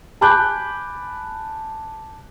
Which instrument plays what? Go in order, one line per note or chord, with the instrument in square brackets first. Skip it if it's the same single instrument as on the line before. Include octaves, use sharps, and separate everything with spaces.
[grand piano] G#5 A5 B5 D6 F#6 G6